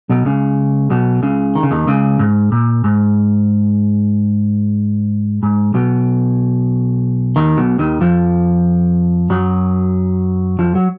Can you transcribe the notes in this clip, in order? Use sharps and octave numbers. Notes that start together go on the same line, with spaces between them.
B1 B2
C#2 C#3
B1 B2
C#2 C#3
D#3
C#3
D#2 D#3
C#2 C#3
G#2
A#2
G#2
G#2
B1 B2
D#2 D#3
B1 B2
D#2 D#3
F2 F3
F#2 F#3
F2 F3
F#3